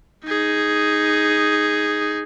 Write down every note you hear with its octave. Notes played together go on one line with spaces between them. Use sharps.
D#4 G#4